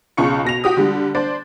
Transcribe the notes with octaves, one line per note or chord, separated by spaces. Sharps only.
B1 C#3 F4 C#6 C#7
B2 A#6 F7
F#4 G4 D#6
D3 G3
D4 C5 D5